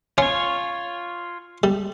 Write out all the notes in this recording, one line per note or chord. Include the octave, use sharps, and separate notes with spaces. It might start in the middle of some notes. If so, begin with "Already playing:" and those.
C#4 F4 C#5
G3